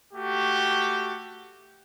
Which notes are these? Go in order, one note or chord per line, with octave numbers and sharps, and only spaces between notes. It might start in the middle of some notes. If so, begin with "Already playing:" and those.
A3 F#4 G4